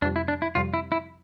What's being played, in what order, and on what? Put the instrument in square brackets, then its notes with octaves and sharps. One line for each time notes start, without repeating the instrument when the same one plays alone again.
[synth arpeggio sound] F2 C3 G3 [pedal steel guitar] D4
[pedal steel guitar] E4
D4
E4
[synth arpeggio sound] F2 C3 G3 [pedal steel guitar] F4
[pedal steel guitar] E4
E4